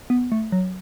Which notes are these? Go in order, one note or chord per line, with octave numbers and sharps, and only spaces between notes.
B3
A3
F#3